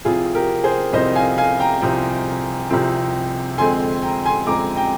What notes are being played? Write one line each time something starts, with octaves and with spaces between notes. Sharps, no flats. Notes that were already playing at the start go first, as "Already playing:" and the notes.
C2 C3 F3 C4 F4 G#4
G4 A#4
G#4 C5
C2 C3 F3 C4 C5 D#5
F5 G#5
F5 G#5
G5 A#5
C2 C3 F3 C4
C2 C3 F3 C4
F2 D3 G#3 C4 G#5 C6
G5 A#5
G#5 C6
F2 D3 G#3 C4 A#5 D6
G5 A#5